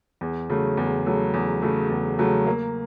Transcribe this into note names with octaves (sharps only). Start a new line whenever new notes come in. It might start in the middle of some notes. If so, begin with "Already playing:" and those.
E2
C#3 F#3 A3
E2
C#3 F#3 A3
E2
C#3 F#3 A3
E2
C#3 F#3 A3
A#3